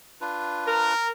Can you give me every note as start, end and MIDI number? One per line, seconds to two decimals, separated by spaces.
0.21 0.94 62
0.21 0.94 65
0.21 0.94 71
0.67 1.09 70